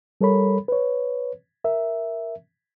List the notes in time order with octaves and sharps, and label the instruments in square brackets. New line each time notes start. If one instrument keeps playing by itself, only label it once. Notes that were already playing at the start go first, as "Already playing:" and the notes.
[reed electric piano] G3 A4 A#4 C#5 B5
B4 C#5
A#4 E5